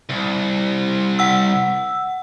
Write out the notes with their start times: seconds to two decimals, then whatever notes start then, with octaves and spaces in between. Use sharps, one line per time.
0.10 C2
1.19 F#5 E6